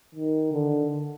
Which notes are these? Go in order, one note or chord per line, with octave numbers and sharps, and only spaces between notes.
D#3
D3